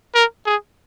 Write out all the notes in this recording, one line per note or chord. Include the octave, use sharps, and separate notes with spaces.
A#4
G#4